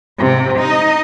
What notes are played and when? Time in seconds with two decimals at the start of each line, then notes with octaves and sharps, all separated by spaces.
0.19 G#2 C3
0.59 D#4 D#5